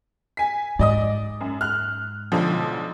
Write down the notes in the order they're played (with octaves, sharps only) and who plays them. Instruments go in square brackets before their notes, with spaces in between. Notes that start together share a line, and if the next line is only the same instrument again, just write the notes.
[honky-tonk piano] G#5 B6
[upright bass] G#2 [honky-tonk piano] D5 D#5 D#6
[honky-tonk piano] F#2
F6 F#6
B1 D3 F3